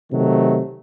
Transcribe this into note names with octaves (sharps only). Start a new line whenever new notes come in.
C3 D#3 F#3 A3